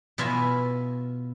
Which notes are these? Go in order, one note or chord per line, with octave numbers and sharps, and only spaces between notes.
B2 E4 F4 E5 G#5 B5